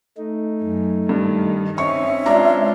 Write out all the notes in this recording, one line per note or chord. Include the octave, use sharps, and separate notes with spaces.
A3 D#4
F#2
G2 D#3
C4 C#4 D#4 E5 C#6
G#3 D4 F4 A#5